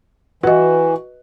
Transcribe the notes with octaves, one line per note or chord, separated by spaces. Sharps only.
E3 F#4 B4 D#5